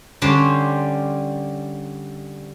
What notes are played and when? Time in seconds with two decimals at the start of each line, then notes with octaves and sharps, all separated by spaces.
0.22 D3 G3 C#4 G4 C5